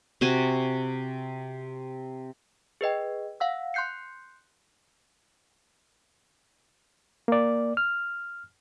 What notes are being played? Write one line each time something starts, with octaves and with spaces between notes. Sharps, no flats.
C3 F#4 G#5
G#4 B4 D#5 G5
F5 F#5 E6
C6 F#6 G6 C7 C#7
A#3 D5
F6